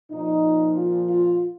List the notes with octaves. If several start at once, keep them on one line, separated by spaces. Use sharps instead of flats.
A#2 F3 D#4
F4
F4